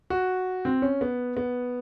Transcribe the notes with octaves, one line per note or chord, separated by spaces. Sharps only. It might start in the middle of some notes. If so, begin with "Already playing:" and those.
F#4
C4
C#4
B3
B3